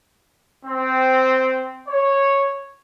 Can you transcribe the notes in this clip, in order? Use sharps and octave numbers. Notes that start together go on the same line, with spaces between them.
C4
C#5